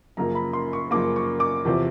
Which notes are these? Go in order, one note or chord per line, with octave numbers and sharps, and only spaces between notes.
F#2 C#3 F3 A#3 A#5
B5
C6
C#6
F#2 C#3 F3 A#3 D6
C#6
D6
E2 C3 F3